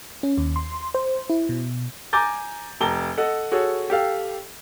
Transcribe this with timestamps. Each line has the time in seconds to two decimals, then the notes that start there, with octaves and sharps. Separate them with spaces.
0.23 C#4
0.38 D#2
0.56 C6
0.94 C5
1.30 E4
1.49 B2
2.13 G#5 A#5 D6 G6 A6
2.81 F1 A5 A#5 G7
3.18 A4 D#5 F#5
3.52 F#4 G#4 A4 C#5
3.90 G4 A4 F5